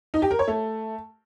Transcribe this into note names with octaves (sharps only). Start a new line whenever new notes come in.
D#4
G4
A#4
C#5
A3